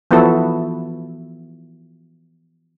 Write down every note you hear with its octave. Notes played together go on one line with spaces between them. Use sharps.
E3 F3 B3 E4 F#4 A4